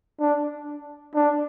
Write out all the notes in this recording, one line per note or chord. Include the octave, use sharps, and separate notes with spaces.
D4
D4